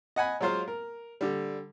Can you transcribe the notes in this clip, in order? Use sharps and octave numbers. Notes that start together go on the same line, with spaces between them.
D#5 F#5 G#5 B5
F#3 G#3 F4 C5 F5
A#4
D3 G3